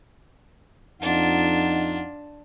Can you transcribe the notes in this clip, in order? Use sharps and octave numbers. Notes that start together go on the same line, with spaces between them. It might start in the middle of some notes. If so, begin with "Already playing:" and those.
F2 D4 D#4 F4 F#5